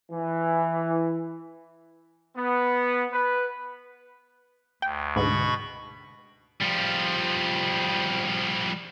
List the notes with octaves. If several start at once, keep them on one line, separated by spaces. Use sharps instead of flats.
E3
B3
B4
D2 G5
D2 G#2 B2 B5 C#6
F3 G3